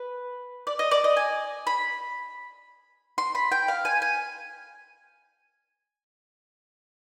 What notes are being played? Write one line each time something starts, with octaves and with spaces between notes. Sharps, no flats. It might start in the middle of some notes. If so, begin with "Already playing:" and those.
Already playing: B4
D5
D#5
D5
D#5
G#5
B5
C6
B5
G5
F5
G#5
G#5